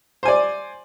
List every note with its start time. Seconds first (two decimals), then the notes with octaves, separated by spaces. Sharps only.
0.23 C5
0.25 G#5
0.28 D5